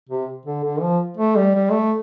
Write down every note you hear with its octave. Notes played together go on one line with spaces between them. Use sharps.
C3
D3
D3
F3
A3
G3
G3
A3